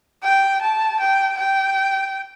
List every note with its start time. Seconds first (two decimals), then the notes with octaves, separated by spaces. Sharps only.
0.23 G5
0.61 A5
1.00 G5
1.38 G5